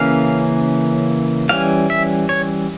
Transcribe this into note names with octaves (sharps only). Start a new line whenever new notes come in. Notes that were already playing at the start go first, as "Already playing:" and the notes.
Already playing: C#3 E3 A#3 C#4 F5
E3 G3 C#4 F5
E5
C#5